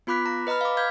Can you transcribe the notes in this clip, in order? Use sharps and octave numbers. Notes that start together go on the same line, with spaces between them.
B3 F4 B5 D6 F#6 B6
A#5
B4 D#5 A#5 B5 F6
F5 D6
F5 F6 G6 G#6 B6